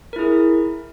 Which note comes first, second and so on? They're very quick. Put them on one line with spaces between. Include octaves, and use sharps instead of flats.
A#4 E4 G#4